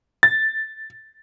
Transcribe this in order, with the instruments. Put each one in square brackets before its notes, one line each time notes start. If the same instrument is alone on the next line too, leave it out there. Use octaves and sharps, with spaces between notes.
[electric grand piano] A6